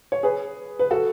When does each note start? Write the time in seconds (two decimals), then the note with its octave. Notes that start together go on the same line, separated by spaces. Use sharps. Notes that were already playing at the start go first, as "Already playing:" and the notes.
0.12 C#5
0.23 G#4 B4
0.79 B4
0.91 F#4 A4